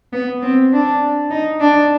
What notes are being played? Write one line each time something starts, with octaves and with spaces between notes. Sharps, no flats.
B3
C4
D4
D#4
D4